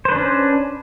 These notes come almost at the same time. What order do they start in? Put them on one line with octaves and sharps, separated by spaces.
C5 B4 D4 C#4